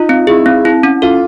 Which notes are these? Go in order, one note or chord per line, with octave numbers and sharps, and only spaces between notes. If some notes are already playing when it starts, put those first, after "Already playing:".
Already playing: D#4 F4
C4
E4 G#4
C4
E4
C#4
F4 A4